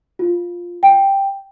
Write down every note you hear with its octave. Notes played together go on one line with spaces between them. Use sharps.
F4
G5